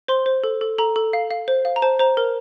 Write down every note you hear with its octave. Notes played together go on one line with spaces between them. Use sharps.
C5 C6
C5
A4
A4
A4 A#5
A4
F5
F5
C5
F5
A#5
C5 A5
C5 A#5
A#4